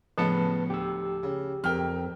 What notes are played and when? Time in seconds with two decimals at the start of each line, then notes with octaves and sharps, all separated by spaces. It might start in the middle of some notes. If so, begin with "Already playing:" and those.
0.18 A2 C#3 F3 B3 B4 A5 C#7
0.70 D2 G4 E6
1.23 C#3
1.64 F2 A#4 G5 F6